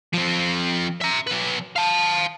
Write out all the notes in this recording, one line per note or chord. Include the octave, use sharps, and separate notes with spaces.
F3 C4
E5 A#5
F#3 B4
F5 A5